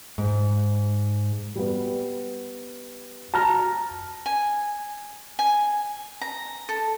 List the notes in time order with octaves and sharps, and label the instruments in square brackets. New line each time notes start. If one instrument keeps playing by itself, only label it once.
[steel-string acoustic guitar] G#2
[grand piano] G3 B3
A5 A#5 F6 A#6
[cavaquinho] G#5
G#5
A#5
A4